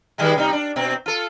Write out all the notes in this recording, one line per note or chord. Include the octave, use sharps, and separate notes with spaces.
D#3 G3 G#3
C3 G3 D#4
D4
B2 C4
F4 A4